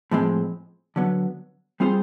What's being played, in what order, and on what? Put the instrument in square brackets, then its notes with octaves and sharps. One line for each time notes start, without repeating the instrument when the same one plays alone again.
[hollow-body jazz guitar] A2 F3 G#3 C4
D3 F#3 B3
G3 C4 F4 G#4 C5